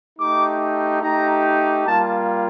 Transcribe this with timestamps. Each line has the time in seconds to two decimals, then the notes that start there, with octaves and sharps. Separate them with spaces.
0.18 A3 D#4 G4 D6
1.01 A3 D#4 G4 A#5
1.85 G3 A#3 F4 A5